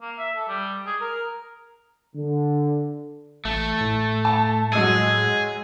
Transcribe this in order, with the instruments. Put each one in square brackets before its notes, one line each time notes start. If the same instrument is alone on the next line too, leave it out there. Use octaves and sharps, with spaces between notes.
[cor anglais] A#3
E5
A4
G3
G#4
A#4
[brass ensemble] D3
[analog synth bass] A1 [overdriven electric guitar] A3
[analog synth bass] A2
[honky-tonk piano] A5
[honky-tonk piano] F#3 G#3 E6 [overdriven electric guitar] G#4